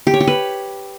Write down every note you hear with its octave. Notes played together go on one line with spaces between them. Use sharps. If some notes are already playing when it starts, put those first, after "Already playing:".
G4
C#5
G4
B4